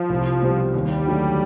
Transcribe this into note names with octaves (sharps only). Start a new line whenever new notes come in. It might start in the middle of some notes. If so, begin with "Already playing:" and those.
Already playing: F3
C2
B2 G3 C4
D#2 G3
D3 F#3 A3